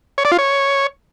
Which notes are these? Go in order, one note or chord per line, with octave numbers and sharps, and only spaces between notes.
C#5
D5
F4
C#5